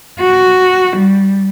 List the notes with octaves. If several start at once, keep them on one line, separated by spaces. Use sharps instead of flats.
F#4
G3